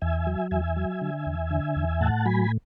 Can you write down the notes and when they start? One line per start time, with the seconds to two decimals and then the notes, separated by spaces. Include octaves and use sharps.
0.02 E2 E5 G#5
0.27 F#3
0.51 E2 E5 G#5
0.76 F#3
1.01 D3
1.26 E2
1.51 D3
1.76 E2
2.01 A2 F#5 A5
2.26 F#3 G#5 B5